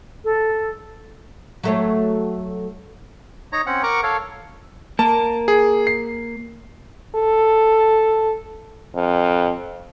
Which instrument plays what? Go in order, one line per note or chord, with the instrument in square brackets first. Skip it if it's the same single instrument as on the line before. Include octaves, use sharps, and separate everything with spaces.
[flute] A4
[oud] F#3 A3 C#5
[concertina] D#4 C#5 A#5
C4 C#4 F#5
A#4 F#5 A#5 C#6 D6
A4 C#5 F5
[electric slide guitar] A#3 A#4 [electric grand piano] A5
[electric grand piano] G#4
C7
[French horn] A4
F2